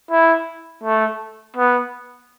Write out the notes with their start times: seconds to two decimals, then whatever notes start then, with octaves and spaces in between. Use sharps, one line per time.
0.11 E4
0.83 A3
1.56 B3